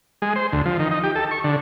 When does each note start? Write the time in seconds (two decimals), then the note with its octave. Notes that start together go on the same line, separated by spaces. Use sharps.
0.22 G#3
0.36 C5
0.52 D2
0.65 F3
0.80 D#3
0.91 D#4
1.03 G4
1.15 A4
1.31 C#6
1.44 D3